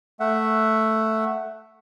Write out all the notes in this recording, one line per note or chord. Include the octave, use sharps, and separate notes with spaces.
A3 E5 F#5